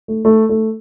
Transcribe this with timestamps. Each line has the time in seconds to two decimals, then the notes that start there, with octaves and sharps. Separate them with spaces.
0.08 A3
0.25 A3
0.49 A3